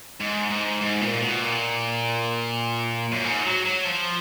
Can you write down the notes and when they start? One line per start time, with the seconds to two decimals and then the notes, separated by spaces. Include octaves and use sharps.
0.20 G#2
0.50 G#2
0.81 G#2
1.01 A#2
1.22 B2
1.42 A#2
3.12 F#2
3.24 G#2
3.44 F#3
3.65 F#3
3.85 F3